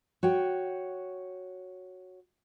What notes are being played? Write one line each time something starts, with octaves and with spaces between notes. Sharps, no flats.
F#4 C#5 G5